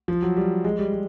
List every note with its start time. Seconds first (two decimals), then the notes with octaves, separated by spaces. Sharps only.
0.08 F3
0.22 F#3
0.37 G3
0.64 G#3
0.79 G3
0.92 G3